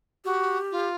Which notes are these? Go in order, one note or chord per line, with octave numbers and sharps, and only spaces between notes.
F#4 G4
F4